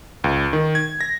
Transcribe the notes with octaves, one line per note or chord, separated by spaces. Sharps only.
C#2
D#3
G#6
A#6